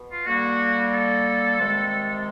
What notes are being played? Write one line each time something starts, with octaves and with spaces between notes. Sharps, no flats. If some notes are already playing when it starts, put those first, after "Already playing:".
Already playing: B2
F4
D3 G3 A#3 F#4
A4
C3 D#3 G#3